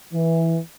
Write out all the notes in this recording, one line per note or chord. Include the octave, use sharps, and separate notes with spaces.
E3